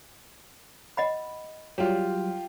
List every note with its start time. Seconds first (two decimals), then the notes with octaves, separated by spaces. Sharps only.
0.97 D#5 F#5 B5
1.78 F#3 G3 F4 G4